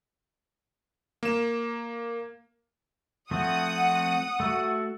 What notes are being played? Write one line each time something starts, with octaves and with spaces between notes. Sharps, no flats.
A#3 E7
F3 A3 C4 F#5 D#6
A3 F#4